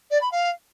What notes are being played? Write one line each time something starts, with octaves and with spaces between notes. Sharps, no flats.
D5
B5
F5